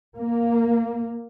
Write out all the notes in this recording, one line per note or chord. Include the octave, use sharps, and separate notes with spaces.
A#3